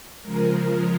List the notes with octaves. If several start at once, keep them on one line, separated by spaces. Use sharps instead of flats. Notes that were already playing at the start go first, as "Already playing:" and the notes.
C#3 F3 G#3 A#4